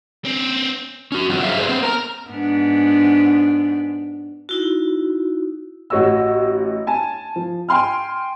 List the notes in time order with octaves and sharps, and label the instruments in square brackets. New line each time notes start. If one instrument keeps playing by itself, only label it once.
[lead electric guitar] C4 C#4
[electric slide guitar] C#4 F#4
F#3 C4 F4 F#4
F#4 G#4 C5 C#5 E5 F5
G#4 B4 C5 D5 E5
B3 C4 C5
A#4 A5 A#5
[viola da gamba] G#2 B3 D4
[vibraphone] D#4 E4 F#4
[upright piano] A1 F#4 C#5 D#5 E6
G#5 A5
F3
G5 G#5 C6 F6